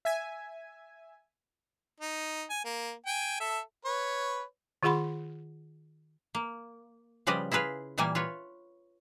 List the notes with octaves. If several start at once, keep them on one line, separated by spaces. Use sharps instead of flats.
E5 G#5
D#4
G#5
A#3
G5 G#5
A4 E5
B4 C#5
D#3 F4 G#4 F#5 B5 C6
A#3
C#3 F3 G3 B4 D5 D#5
E4 F4 G#4 B4 F5
A#2 E3 G3 A#3 G#5
F4 B4 C#5